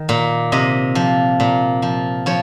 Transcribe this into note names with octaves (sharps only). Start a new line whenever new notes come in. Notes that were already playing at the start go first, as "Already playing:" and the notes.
Already playing: D#3
A#2
C3 D#5
F3
A#2
F3
F3 C#5